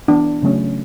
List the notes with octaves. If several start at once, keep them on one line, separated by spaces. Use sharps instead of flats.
E3 B3 D4
C#3 F#3 A3 C#4